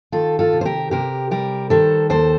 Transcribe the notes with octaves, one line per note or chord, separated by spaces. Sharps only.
D#3 F4 A4
F4 A4
C3
C5
G4 A#4
C3 G4 A#4
G3 G4 A#4
D#3 A4 C5
D#2 A4 C5